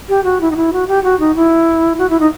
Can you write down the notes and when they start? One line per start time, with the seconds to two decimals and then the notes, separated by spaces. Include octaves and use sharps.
0.09 G4
0.24 F#4
0.41 E4
0.51 D#4
0.56 E4
0.73 F#4
0.88 G4
1.04 F#4
1.20 D#4
1.36 E4
1.98 F#4
2.10 E4
2.20 D#4